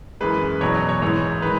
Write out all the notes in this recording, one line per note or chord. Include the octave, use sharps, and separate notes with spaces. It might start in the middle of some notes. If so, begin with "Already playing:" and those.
F#2 E3 G#3 B4
E2 B2 F#3 C#5
D#5
C#5
G#2 E3 G#3 C#5
D#3 G#3 B4